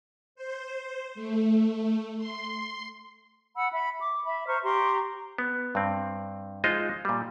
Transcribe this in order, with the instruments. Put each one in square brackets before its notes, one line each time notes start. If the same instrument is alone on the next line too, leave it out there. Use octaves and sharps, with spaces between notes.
[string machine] C5
A3
C6
[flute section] F#5 B5 E6
E5 B5
D6
E5 B5
C5 A#5 C#6 F6
G4 A#5 C6 C#6
[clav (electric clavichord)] B3
G2 C4
G#3 D#4 F4 C5 D#5
A#2 G3